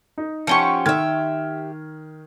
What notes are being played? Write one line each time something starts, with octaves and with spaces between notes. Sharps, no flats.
D#4
F3 C#4 G4 F#5 C6 C#6
D#3 G4 E5 F6 G#6